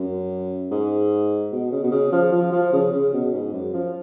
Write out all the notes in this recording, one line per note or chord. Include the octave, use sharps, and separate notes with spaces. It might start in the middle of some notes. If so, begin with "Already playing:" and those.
Already playing: F#2
G#2
B2
C#3
B2
C#3
F3
F3
F3
C#3
C#3
B2
G#2
F#2
F3